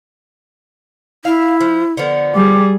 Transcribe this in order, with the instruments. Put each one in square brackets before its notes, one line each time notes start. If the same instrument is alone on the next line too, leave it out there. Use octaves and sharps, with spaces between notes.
[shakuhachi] E4 [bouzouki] F5
[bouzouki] F3
D3 F3 B3
[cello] G3 G#4 [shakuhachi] D6